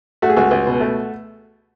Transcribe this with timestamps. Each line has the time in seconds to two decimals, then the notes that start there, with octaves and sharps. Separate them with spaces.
0.22 A3 F#4
0.29 G#4
0.37 C#2 F#4
0.51 C#2
0.66 B2
0.80 A3